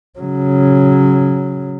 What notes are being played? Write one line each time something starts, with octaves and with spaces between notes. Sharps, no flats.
C#3 F#3